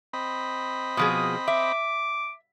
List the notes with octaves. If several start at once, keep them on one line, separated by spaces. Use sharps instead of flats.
C4 D#5 B5
B2 F3 G#4 D#6
E5 D6